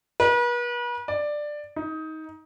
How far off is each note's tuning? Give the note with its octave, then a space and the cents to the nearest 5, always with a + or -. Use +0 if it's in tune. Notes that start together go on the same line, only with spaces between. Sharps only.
B4 -40
D5 +10
D#4 +20